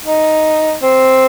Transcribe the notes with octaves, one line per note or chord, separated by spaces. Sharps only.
D#4
C4